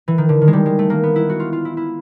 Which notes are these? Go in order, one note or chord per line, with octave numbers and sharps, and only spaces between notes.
E3
D#3
D3
D#3
G#3
G3
G#3
A3
A#3
B3
E4
F#4
F4
F4
E4
E4